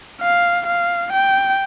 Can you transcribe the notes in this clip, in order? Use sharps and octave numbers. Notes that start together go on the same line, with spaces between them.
F5
F5
G5